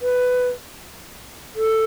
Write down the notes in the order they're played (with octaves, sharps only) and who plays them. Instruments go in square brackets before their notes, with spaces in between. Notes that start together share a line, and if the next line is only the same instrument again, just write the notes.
[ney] B4
A4